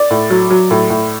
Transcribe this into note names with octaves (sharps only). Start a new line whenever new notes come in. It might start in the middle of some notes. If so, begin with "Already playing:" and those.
Already playing: D5
A2
F#3
F#3
A2
A2